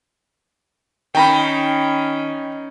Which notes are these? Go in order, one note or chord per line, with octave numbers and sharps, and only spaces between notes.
D#3 C#4 G5 A#5 B5